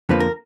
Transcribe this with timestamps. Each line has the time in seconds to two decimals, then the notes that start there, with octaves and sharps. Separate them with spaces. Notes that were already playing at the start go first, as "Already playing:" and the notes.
0.09 F2 D3 F3 A#3 B4
0.20 A#4